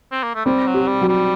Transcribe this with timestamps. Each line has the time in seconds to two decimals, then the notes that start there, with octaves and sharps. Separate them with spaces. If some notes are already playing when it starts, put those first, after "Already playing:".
0.12 C4
0.23 A#3
0.35 A3
0.46 G3 C4
0.67 F#3
0.74 G4
0.88 G3
1.01 F#3
1.09 G3